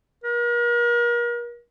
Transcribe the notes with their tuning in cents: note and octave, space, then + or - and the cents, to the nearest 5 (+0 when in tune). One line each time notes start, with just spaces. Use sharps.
A#4 +40